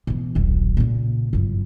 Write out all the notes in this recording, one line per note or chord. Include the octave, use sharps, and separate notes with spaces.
B2 E3
D#1 B1
A#2 C#3
G1 F#2